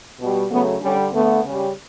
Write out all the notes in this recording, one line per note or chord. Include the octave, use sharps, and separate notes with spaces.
B2 G3
C#3 F#3 A3 B3
D3 G3 C#4
D3 A3 B3
C#3 G3